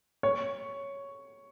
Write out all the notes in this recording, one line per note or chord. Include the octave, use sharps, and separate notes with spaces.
C#5